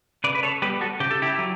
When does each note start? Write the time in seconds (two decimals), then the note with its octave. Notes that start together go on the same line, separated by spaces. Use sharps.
0.24 C#3 B4 D5
0.35 B4
0.43 A4 C#5
0.62 G3 B3 G4 B4
0.81 F#4 A4
1.00 C#3 G4
1.11 A4
1.22 E4 G4
1.38 F#3